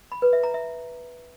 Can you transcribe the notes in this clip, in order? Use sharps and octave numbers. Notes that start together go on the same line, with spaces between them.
B5
B4
E5
A#5
E5